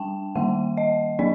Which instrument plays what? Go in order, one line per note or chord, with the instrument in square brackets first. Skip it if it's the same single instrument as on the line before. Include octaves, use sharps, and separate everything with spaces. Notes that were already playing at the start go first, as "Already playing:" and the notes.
Already playing: [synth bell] G3 D4 G5 A5
D#3 G3 A#3 F#5
D#5
F#3 A#3 D4 D5